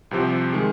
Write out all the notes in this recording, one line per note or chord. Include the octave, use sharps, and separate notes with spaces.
C2 C3 F3 C4 G4
D#3 G#3